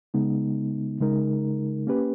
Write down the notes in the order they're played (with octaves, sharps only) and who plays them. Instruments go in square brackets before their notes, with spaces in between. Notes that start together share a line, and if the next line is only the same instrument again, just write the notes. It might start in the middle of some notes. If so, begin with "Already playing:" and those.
[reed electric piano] C#3 G#3 B3 D#4
C#3 G#3 D#4 A#4
A#3 C#4 G4 B4